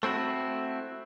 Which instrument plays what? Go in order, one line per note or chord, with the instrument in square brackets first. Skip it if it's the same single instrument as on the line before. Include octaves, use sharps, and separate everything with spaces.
[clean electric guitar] A3 C4 E4 F#4